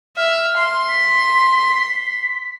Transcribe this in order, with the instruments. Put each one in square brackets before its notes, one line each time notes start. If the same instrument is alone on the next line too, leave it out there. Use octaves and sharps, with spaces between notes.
[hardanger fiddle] E5 [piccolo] F6
[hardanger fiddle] C6
[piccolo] B6